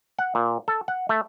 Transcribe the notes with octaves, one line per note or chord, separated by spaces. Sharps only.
F#5
A#2
A4
F#5
A3